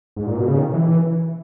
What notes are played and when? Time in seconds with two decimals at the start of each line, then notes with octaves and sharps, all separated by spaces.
0.16 G#2
0.27 A#2
0.38 B2
0.48 C#3
0.58 D#3
0.74 E3